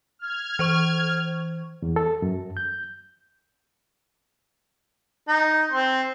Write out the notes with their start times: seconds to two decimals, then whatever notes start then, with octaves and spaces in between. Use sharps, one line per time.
0.19 F6 G#6
0.59 E3 C5 C#6
1.82 E2
1.96 A4
2.22 F#2
2.57 G6
5.28 D#4
5.72 C4 C6